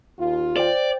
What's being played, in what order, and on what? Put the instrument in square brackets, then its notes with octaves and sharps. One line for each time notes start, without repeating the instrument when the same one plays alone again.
[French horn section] D#2 F4
[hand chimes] C5 G5 [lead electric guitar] D5